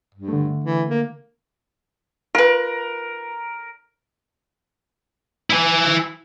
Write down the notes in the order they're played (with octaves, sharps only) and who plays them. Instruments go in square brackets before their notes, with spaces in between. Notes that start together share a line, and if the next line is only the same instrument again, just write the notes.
[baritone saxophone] G2
[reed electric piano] D3 A3
[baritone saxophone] E3
A#3
[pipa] F4 B4 [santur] A#4
[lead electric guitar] E4 G#5